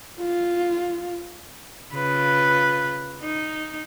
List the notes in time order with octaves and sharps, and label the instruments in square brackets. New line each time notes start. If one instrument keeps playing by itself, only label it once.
[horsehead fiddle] F4
[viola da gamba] C#3 F4 B4
D#4